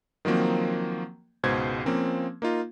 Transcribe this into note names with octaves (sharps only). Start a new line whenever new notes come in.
D#3 F3 F#3 A#3 C4
C#2 G#2 B2 C5 G#6
F3 A#3 C4 C#4
A#3 D#4 F4